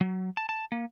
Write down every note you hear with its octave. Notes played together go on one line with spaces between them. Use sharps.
F#3
A5
A5
A#3